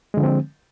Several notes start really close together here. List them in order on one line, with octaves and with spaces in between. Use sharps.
G#3 D3 F3 C4